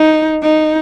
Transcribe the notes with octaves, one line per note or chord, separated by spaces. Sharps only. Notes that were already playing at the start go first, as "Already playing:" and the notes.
Already playing: D#4
D#4